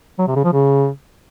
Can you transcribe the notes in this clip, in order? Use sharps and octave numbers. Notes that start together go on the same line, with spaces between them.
F#3
C3
C#3
F3
C#3